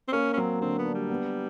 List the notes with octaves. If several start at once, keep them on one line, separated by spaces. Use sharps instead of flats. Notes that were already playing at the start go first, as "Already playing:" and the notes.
C4
A#3 C#4
C#4
F#3 C4
D3 C4
B3
D4
G3
B3